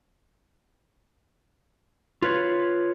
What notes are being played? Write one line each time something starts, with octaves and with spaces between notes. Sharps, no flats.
F4 B4 C#5